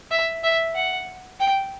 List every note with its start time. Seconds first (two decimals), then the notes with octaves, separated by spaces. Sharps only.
0.11 E5
0.44 E5
0.75 F#5
1.40 G5